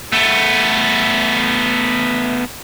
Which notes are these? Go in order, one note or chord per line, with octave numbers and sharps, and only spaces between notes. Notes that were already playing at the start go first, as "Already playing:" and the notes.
A3 B3